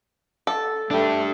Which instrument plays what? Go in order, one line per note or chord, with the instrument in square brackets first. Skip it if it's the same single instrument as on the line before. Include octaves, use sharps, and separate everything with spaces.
[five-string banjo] A4
[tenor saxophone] A3 [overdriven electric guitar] D4 G4